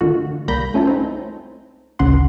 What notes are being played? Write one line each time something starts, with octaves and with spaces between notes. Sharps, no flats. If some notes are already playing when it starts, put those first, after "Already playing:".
D3 D#3 A3 F4 F#4
C2 G3 A#3 B5 G6 A#6
A3 C#4 E4 F4 A4
C4 D#4
A1 D2 C#3 C#4 F#5 C6